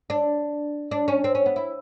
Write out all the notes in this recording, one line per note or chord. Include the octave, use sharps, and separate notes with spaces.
D4
D4
C#4
C4
C#4
B3
E4